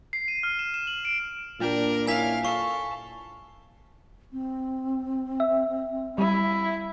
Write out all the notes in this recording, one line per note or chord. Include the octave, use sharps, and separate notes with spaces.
C7
D#7
F6
E7
E7
F#7
D7
A#2 D4 F4 G4 A#4
C#4 E4 F5 G#5 B6
A4 F5 C#6
C4
E5
G3 E4